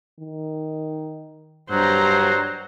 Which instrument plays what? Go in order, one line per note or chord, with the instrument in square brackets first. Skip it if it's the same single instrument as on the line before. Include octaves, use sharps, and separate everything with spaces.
[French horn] D#3
[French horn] G2 [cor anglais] F#3 [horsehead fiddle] C5 A#5